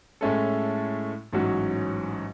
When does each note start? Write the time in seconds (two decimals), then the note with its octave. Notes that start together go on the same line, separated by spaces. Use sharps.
0.21 A2 G#3 C#4 E4 A4
1.33 A1 G#2 F#3 C#4 F#4